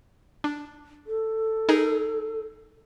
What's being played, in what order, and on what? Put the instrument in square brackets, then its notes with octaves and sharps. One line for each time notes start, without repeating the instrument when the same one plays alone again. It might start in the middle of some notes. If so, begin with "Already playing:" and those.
[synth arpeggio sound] D4
[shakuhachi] A4
[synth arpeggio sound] D#4 G#4 A#4